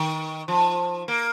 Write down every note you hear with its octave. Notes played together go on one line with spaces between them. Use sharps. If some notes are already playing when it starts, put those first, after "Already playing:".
Already playing: D#3
F3
A#3